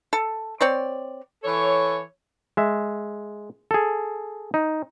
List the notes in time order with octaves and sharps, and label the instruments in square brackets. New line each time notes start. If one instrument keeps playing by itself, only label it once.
[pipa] A4
C4 C#5 D5
[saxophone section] E3 A4 C#5
[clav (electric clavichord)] G#3 E5
G#4 A4
D#4